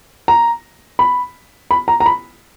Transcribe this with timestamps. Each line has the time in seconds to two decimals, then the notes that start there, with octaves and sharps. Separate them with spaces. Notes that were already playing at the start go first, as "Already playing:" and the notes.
0.28 A#5
0.99 B5
1.71 B5
1.88 A#5
2.00 A#5
2.06 B5